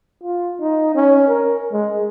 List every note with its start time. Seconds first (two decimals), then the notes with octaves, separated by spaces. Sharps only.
0.24 F4
0.61 D#4
0.95 C#4
1.28 A#4
1.72 G#3